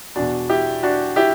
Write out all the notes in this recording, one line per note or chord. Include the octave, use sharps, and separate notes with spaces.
E2 B2 D4 F#4
E4 G4
D4 F#4
E4 G4